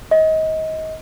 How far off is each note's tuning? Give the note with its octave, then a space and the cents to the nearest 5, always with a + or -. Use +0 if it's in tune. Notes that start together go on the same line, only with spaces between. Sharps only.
D#5 +25